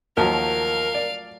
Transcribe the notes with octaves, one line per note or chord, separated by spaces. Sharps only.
D#2 F3 F#3 A3 A#4 F5
D5